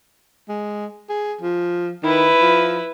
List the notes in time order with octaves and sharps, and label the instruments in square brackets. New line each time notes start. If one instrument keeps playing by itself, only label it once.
[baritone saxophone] G#3
G#4
F3
[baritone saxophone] D#3 [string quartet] E4 B4
[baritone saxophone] F3